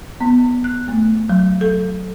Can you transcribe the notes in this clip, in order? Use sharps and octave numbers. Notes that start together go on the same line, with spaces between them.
B3
F#6
A3
F#3
A4